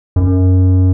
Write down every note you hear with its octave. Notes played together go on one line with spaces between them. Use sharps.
F#2